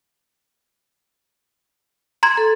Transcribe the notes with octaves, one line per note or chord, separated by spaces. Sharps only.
A#5 C6 G#6
A4